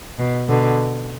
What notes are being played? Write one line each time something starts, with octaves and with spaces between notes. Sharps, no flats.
B2
B2 D3